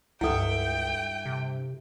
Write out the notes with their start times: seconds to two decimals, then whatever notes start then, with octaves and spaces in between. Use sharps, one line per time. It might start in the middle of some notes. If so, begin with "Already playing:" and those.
0.21 C#2 G2 E4 A4 E5 F#5 G5
1.26 C3